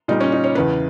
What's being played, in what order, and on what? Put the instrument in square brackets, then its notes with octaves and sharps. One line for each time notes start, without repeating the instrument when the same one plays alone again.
[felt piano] A#2 G3 D#4
C#4
D#4
C#5
E2 C#3 E3 B4